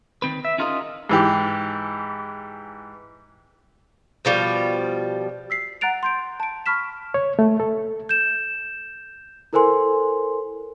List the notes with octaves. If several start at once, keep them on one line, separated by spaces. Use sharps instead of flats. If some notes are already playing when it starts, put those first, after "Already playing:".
D#3 C4 B4
E5
C#4 D#4 F4 G#4 A#4 D#5
G#2 E3 G4
B2 F3 G3
E6 B6 C7
F#5 A#5 F#6 A6 D7 F7
C6 G6 D7
A5 D7
A5 B5 C#6 F6 B6 E7
C#5
A3
A4
G6 E7
E4 A4 A#4 C5 G#5 C6